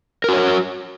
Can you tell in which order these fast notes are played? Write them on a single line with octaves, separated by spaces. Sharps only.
A#4 F#4 C#5